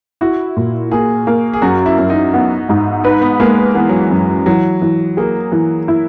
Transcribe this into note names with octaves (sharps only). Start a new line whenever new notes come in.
E4 F#4
A#2
A#3 G#4
A#3
G#4
F#2 F#4
E4
F#2
D#4
B3
G#2
D#4 B4
B3
G#3 A#3
E3 B3
F#3
E3
F#2
E3 F#3
E3
A#3 G#4
E3
E4